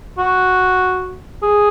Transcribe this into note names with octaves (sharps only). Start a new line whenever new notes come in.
F#4
G#4